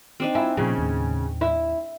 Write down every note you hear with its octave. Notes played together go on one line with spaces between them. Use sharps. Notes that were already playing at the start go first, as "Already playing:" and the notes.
C4 D4 D#4
E4 F4 G#5
A#2 C#3 F3
D#2 A2
E4